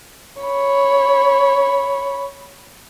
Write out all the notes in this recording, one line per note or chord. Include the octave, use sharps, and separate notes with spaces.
C#5 B5